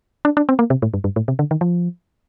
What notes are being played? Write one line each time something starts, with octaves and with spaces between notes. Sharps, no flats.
D4
D4
C4
A#3
C3
A2
G2
G2
A2
C3
D3
D#3
F3